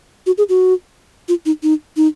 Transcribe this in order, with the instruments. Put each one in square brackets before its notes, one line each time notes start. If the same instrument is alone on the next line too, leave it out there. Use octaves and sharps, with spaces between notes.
[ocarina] F#4
G#4
F#4
F4
D#4
D#4
D#4